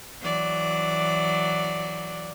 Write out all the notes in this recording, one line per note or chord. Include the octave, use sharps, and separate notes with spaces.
E3 F#3 D5